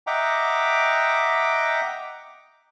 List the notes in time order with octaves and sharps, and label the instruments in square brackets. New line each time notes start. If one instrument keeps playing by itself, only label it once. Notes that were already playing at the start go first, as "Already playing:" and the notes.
[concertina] D#5 E5 F#5 G5 A#5 D6